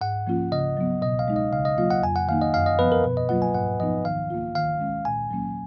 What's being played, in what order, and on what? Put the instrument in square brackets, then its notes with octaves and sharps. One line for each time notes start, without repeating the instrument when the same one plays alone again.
[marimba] G#2 [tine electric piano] F#5
[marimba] F3 A#3 C#4 F4
[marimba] C#3 [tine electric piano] D#5
[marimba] F#3 B3
[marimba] B2 [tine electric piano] D#5
[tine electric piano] F5
[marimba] G#3 D#4
[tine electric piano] D#5
[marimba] C#3 [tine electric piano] F5
[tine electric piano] D#5
[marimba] F#3 A#3 F4 [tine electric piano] F5
[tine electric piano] F#5
[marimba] F2 [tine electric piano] G#5
[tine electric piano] F#5
[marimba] D#3 A#3 D#4 [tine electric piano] F5
[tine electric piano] D#5
[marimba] F#2 [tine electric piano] F5
[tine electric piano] D#5
[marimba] F3 B3 [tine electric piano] B4
[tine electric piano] A#4
[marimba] B2 [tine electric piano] B4
[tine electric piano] D#5
[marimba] F#3 A#3 F4 [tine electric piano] F#5
[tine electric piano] G#5
[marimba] G#2 [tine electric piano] F#5
[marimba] F3 B3 D#4 [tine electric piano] D#5
[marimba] D#3 [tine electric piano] F5
[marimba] A#3 F4
[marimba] D#3 [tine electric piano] F5
[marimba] G#3 C#4
[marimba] A#2 [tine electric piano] G#5
[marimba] F#3 A#3 C#4